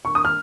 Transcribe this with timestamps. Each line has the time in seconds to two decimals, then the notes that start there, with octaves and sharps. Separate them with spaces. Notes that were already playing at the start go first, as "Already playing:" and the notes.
0.05 C#6
0.15 D#6
0.25 F6